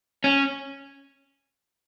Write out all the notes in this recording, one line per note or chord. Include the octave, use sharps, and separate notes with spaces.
C#4